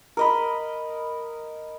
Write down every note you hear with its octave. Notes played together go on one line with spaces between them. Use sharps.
A#4 D#5 B5